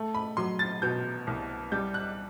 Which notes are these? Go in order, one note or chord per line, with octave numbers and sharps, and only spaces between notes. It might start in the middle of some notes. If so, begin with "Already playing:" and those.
Already playing: A3
B5
F#3 C6
A6
B2 G6
C2
G3 G6
F#6